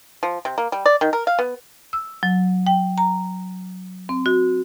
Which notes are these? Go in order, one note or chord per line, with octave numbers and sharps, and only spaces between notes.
F3
C3
A#3
G3
D5
D#3
A#4
F5
B3
E6
F#3
G5
A#5
C4
F#4